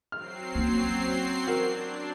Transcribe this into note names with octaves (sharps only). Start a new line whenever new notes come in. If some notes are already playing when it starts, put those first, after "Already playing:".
F#3 C4 F6 C7
A#3 C#4
D4 F#4 A#4